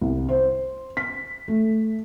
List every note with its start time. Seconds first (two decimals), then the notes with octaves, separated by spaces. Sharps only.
0.01 C2
0.29 C5
0.97 B6
1.48 A3